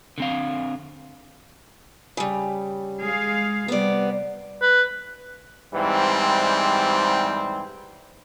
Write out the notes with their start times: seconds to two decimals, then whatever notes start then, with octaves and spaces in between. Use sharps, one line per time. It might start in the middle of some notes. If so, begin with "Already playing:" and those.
0.18 D3 C4 F5
2.17 C#3 G3
3.02 G#3 G#4 F5
3.68 C3 G3 B3 D5
4.62 B4
5.73 G#2 E3 G3 C4